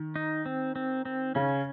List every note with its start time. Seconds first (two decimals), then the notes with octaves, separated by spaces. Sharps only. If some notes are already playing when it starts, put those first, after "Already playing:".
Already playing: D#3
0.16 D#4
0.46 C4
0.76 C4
1.05 C4
1.35 C#3 C#4